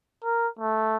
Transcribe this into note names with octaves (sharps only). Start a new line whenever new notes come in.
A#4
A3